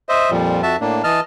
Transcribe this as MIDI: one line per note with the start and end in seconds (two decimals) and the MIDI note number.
0.09 0.30 72
0.09 0.30 75
0.09 0.30 76
0.30 0.62 41
0.30 0.62 46
0.30 0.62 53
0.30 0.62 55
0.63 0.76 41
0.63 0.76 66
0.63 0.76 76
0.63 0.76 81
0.81 1.02 45
0.81 1.02 58
0.81 1.02 62
1.04 1.20 52
1.04 1.20 75
1.04 1.20 81
1.04 1.20 89